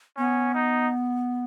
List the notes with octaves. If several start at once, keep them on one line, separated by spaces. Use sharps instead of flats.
B3 C#4
D#4